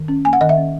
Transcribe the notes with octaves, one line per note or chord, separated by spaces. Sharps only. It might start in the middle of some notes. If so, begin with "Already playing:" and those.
Already playing: D#3
C#4
A#3 G#5
F#5
D#3 D#5
E5
C#4